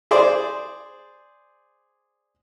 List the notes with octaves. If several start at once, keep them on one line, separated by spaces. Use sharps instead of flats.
G#4 C5 D5